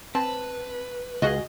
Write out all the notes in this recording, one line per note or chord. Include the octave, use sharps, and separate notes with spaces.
C4 B4 A5
C#2 F4 F#4 G#4 D#5